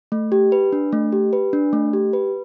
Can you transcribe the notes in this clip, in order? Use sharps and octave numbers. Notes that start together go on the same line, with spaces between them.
A3
G4
B4
D4
A3
G4
B4
D4
A3
G4
B4